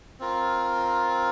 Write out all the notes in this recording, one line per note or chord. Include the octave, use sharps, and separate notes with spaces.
C4 F4 A#4